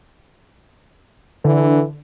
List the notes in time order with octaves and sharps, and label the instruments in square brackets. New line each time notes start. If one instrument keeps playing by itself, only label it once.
[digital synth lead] D3 [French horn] E3